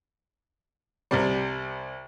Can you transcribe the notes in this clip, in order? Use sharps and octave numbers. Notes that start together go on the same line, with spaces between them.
C2 C3 G3